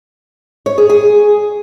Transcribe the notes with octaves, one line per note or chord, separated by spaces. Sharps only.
C#5
G#4
G#4